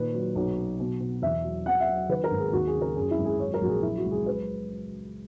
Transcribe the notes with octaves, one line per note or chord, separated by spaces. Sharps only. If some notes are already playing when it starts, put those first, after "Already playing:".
Already playing: A#2 D#3 B4
F#3
B1
F#3
B2
B2
E2 E5
F#3
F#3 F#5
E5
F#3
D#3 B4
A#4
G#1
G#4
D#2 F#4
G#4
C#3
A#4
F#2 G#4
E4
G#1
G#4
F#3 C#5
A#4
A#1 F#4
G#4
F#3 E4
F#4
C#2
G#4
F#3 B4